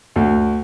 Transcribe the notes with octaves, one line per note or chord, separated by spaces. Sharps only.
D2